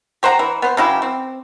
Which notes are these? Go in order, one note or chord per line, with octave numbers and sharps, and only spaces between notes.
G4 C5 F#5 A#5
E3
B3 C5
C#3 F#3 E4 G4
C4